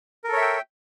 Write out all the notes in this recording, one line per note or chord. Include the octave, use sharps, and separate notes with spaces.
A4 A#4 C#5 E5 G5